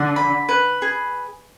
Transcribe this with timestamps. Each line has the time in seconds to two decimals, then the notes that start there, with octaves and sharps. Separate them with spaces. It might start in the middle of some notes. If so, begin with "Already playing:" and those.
Already playing: D3 F#5
0.16 B5
0.49 B4
0.82 G#4